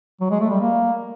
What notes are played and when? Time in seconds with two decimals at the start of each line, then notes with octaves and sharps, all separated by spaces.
0.21 F#3
0.31 G#3
0.41 A3
0.50 G3
0.60 A#3